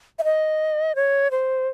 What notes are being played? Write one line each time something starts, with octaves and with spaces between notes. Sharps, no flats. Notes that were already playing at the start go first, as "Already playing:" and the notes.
E5
D#5
C#5
C5